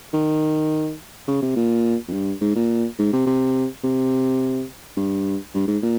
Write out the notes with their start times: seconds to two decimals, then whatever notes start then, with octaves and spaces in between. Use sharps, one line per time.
0.14 D#3
1.28 C#3
1.42 C3
1.56 A#2
2.08 F2
2.13 G2
2.41 G#2
2.56 A#2
2.99 G#2
3.13 C3
3.27 C3
3.84 C3
4.97 G2
5.55 G2
5.68 G#2
5.83 A#2